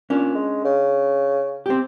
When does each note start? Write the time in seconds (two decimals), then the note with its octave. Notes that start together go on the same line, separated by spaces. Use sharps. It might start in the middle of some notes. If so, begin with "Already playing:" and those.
0.10 A#2 C#4 D4
0.35 G#3
0.65 C#3
1.66 C4 G4